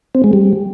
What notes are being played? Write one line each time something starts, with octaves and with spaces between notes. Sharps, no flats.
C4
G#3
G3